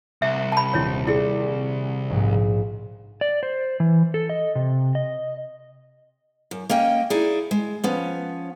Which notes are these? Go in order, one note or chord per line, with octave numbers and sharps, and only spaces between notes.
C2 E5
A5 B5
D#1 C4 E4 C#5
E4 G#4 D5 C7 C#7
A#1 G#2
D5
C5
E3
A4
D#5
C3
D#5
F#2
A#3 C#4 D#5 G5
D#4 E4 G#4 D5
G#3
F3 B3 C#4